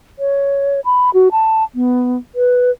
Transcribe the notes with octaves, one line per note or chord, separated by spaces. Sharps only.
C#5
B5
F#4
A5
B3
B4